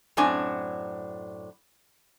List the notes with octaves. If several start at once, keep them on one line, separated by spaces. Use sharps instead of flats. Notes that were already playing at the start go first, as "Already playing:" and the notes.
F#2 A2 C4 D4 G#5 A5